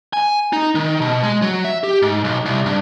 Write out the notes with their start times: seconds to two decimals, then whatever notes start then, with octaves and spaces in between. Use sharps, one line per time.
0.13 G#5
0.53 D#4
0.75 D#3
1.01 B2
1.23 G#3
1.42 F#3
1.65 E5
1.84 G4
2.02 G#2
2.24 B1
2.45 C2
2.66 G2